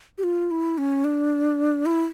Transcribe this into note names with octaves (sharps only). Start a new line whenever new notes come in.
G4
F4
E4
C#4
D4
E4